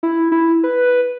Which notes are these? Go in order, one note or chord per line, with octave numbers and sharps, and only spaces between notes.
E4
E4
B4